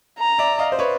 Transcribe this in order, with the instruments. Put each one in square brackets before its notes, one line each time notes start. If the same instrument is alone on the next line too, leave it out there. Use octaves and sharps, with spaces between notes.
[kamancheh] A#5
[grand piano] D5 E5
D#5 F5
C5
B4 C#5